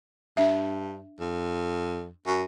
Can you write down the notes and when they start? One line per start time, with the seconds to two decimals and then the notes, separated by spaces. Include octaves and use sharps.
0.37 G2 D4 E5
1.20 F2
2.27 F#2